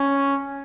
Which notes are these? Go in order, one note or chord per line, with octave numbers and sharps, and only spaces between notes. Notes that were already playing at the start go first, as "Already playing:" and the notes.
Already playing: C#4